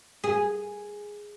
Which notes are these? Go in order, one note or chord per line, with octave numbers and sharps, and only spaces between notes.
G#4